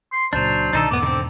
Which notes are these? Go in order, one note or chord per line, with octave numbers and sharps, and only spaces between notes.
C6
C#2 A#2 F#3 D4 C5
C2 B2 D#3 D4 D#4 A4
E2 G#2 B2 A3 B3 D6
D3 C4